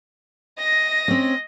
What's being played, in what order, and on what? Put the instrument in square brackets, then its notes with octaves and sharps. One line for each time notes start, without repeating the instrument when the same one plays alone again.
[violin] D#5 A#6
[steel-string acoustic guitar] C4 C#4